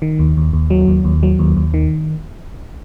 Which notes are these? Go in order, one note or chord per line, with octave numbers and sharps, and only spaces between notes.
D#3
D#2
D#2
D#2
F#3
D#2
D#2
F#3
D#2
D#2
D#3